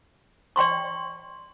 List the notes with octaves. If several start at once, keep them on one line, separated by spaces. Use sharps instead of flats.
D5 G5 C6 C#6